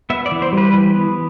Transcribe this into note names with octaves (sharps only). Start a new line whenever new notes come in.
B3 E5
D5
E3
C5
G3
B4
E3
B3